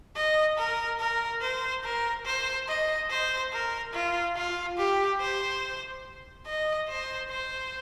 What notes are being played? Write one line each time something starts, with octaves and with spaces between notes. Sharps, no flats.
D#5
A#4
A#4
C5
A#4
C5
D#5
C5
A#4
F4
F4
G4
C5
D#5
C5
C5